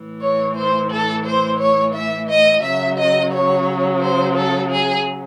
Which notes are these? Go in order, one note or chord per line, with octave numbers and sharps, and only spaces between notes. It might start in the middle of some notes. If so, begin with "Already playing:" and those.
Already playing: A2 E3
C#5
C5
A4
C5
C#5
E5
D#5
C#3 F#3 E5
D#5
C#5
C5
A4
G#4